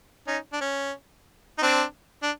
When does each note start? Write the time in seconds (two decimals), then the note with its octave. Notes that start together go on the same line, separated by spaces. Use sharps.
0.27 C#4 D#4
0.53 D4
0.61 C#4
1.58 D#4
1.62 C4 D4
2.23 D4